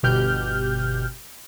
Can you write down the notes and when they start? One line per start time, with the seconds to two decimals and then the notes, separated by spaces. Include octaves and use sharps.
0.03 G1 B2 G4 F6 G6